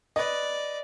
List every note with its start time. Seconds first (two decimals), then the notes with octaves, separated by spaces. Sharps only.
0.16 B4 D5 D#5